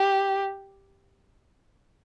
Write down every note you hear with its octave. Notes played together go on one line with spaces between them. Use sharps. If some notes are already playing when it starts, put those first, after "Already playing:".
Already playing: G4